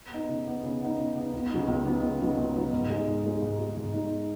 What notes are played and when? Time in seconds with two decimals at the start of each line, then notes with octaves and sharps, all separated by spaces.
0.11 B3 D#4
0.29 C#3
0.46 B3 D#4
0.63 C#3
0.81 B3 D#4
0.98 C#3
1.15 B3
1.20 D#4
1.33 C#2
1.50 C#3 F#3 B3 D#4
1.68 C#2
1.85 C#3 F#3 B3 D#4
2.02 C#2
2.21 C#3 F#3 B3 D#4
2.37 C#2
2.56 C#3 F#3 B3 D#4
2.73 G#2
2.90 G#3 D#4
3.07 G#2
3.24 G#3 D#4
3.42 G#2
3.59 G#3 D#4
3.77 G#2
3.94 G#3 D#4